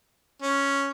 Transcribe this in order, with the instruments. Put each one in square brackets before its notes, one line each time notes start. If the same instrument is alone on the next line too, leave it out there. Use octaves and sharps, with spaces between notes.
[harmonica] C#4